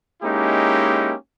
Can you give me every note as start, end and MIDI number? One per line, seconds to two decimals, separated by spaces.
0.23 1.14 56
0.23 1.14 58
0.23 1.14 61
0.23 1.14 63
0.23 1.14 64
0.23 1.14 67